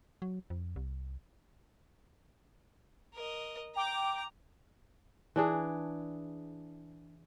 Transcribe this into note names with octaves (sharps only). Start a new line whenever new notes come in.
F#3
F2
C2
A#4 D#5
G5 A#5 D6
E3 D4 G#4